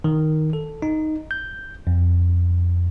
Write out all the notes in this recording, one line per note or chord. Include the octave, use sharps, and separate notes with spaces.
D#3
A4
D#4
G6
F2